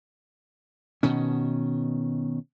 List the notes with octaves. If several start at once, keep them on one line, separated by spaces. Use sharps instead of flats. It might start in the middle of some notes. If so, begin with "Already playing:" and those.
B2 D#3 C#4